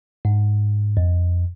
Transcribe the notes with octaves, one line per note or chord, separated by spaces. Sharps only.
G#2
F2